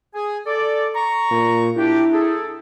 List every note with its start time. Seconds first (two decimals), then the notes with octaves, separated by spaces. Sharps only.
0.14 G#4 G#5
0.46 A4 D5
0.95 A#5 C#6
1.31 A#2
1.77 D4 E4 G4
2.13 G#4 A4